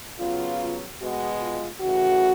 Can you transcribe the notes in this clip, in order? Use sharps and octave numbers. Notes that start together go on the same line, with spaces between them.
C#3 F#3 B3 F4
B2 G#3 B3 F#4
F4
C#3 E3 A3 F#4